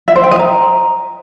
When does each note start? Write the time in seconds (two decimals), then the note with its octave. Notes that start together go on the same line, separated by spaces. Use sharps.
0.08 E5
0.16 C5
0.23 G5
0.31 D#5
0.39 A#5